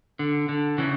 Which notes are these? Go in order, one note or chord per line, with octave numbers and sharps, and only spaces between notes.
D3
D3
C#3 E3